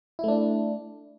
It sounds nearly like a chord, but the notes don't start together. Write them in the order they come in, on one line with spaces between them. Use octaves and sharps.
E4 A3 D4